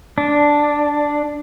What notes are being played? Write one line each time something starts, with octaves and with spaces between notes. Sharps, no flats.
D4